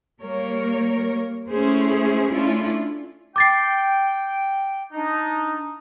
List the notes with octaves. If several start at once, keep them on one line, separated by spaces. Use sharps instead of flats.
G3 A#3 A#4 C#5
A3 C#4 E4 G#4 C5
A3 C#4 D4 E4 F4
G5 D6 A6 C7
D4 D#4